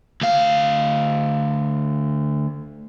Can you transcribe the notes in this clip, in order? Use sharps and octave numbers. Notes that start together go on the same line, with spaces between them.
D2 F5